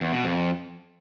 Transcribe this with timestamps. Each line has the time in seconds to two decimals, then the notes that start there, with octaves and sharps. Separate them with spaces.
0.01 E2
0.13 B2
0.24 F2